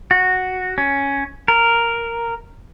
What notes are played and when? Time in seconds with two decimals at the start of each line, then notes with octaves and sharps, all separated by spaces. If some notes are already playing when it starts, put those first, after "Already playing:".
0.11 F#4
0.78 C#4
1.48 A#4